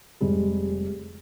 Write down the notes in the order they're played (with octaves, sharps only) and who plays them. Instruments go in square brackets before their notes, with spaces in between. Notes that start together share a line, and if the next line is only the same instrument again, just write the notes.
[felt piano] F1 G3 G#3